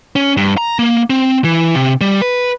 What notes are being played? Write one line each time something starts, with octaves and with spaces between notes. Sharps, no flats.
C#4
G2
A#5
A#3
C4
E3
C3
G3
B4